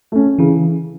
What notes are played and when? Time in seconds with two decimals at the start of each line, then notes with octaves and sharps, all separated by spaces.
0.12 A3 C#4
0.39 C#3 E3